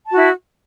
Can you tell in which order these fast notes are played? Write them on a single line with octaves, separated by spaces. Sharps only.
A5 F#4 E4